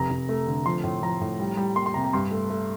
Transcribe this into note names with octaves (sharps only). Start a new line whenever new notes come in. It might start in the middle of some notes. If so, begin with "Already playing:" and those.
Already playing: F1 A#5
F1
A3
D3
F3 C6
A2
F3 A#5
A2
G3
G3
A#3 C6
C6
C3 A#5
A#5
G2 C6
A3
A3